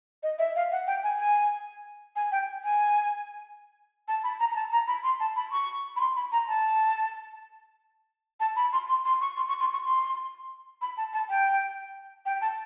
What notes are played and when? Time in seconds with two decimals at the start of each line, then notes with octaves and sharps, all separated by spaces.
0.23 D#5
0.39 E5
0.56 F5
0.72 F#5
0.87 G5
1.03 G#5
1.19 G#5
2.16 G#5
2.32 G5
2.64 G#5
4.08 A5
4.24 B5
4.40 A#5
4.51 A#5
4.56 A5
4.72 A#5
4.88 B5
5.04 C6
5.20 A5
5.36 B5
5.52 C#6
5.96 B5
6.00 C6
6.16 B5
6.32 A#5
6.48 A5
8.40 A5
8.56 B5
8.73 C6
8.88 C6
9.05 C6
9.21 C#6
9.37 C6
9.49 C#6
9.60 C6
9.73 C#6
9.85 C6
10.82 B5
10.97 A5
11.13 A5
11.30 G5
12.26 G5
12.42 A5